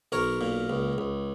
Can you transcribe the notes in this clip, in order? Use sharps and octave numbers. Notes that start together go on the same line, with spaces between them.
B1 A#4 C#5
A#2
C#2
C#2